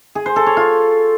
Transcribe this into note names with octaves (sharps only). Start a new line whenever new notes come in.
G#4
C5
A4
C#5
F4